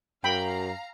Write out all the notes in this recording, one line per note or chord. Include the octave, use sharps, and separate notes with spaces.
F#2 F5 G5 A#5 B5